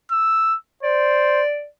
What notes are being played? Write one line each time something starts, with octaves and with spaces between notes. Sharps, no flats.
E6
C5 D5